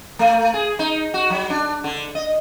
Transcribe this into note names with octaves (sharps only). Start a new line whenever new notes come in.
A3
G#4
D#4
F#4
F#3
D4
D3
D#5